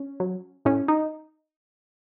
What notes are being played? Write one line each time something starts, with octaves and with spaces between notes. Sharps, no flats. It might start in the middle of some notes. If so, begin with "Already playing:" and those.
Already playing: C#4
F#3
A2 C#4
D#4